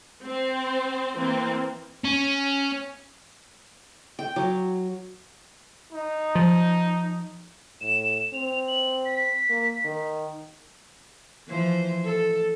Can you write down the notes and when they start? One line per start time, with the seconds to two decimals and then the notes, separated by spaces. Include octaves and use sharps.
0.23 C4 C5
1.16 E3 A#3 C4
2.04 C#4
4.19 G5
4.36 F#3
5.92 D#4
6.35 F3
7.81 A2 E7
8.33 C4 F7
8.68 F#7
9.05 B6
9.50 A#3
9.85 D#3
11.48 E3 F3 C5
12.05 A4